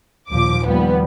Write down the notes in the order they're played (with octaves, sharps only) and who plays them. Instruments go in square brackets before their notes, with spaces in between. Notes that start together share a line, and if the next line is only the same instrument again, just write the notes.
[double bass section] D#2 A#2 F3 [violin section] D6
[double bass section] D#2 F3 G3 [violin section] B3